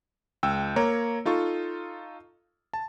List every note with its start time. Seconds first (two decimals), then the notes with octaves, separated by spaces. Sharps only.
0.43 C#2 G5 E6
0.76 A#3 C#5 A#5
1.25 D#4 F4 A4 C#6
2.73 A5